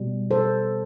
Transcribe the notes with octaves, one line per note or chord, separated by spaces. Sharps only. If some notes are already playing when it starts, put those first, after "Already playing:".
Already playing: B2 G3
A4 C5